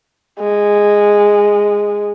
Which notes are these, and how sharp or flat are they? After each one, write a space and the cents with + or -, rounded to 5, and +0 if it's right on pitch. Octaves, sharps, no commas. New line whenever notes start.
G#3 -10